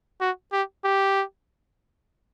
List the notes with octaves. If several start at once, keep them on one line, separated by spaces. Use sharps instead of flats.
F#4
G4
G4